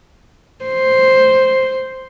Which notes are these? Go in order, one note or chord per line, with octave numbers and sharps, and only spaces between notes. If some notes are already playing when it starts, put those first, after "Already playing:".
C5